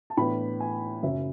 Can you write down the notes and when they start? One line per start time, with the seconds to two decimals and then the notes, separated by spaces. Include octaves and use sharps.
0.10 A5
0.17 A2 E3 B3 D4 B5
0.60 G#5
1.03 F#1 F#2 C#3 F#3 C#4 E5